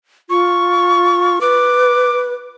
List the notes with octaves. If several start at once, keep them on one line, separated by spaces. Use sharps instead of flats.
F4 C#6
B4 D6